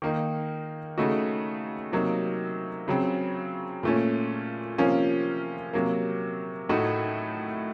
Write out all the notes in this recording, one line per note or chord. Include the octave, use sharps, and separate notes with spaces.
D#3 A#3 D#4
C#3 A3 D#4 F#4
C3 F#3 A#3 D#4
C#3 F#3 C4
A#2 A3 C#4
C3 F3 A#3 C#4 F4
C3 F#3 A#3
A2 A3 D#4 F#4